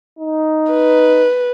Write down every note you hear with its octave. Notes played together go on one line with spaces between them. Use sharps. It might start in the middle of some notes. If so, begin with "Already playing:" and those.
D#4
B4